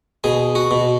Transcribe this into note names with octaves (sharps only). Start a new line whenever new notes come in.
B2 G#4
F#4
B2